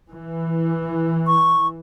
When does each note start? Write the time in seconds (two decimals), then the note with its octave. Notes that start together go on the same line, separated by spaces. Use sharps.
0.10 E3
1.27 C#6